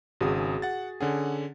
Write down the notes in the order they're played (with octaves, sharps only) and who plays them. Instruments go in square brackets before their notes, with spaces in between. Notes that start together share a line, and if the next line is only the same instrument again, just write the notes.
[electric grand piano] G#1 C#3 D#6 [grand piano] F#4 G#4
[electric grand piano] F#5 A6
[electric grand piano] D3 C#4 G#4 [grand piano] F#5